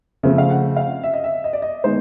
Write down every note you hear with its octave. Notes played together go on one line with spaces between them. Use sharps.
C#3 F3 A3 C4
F5
F#5
F5
E5
D#5
E5
D#5
D5
D#5
D#3 G#3 B3 C5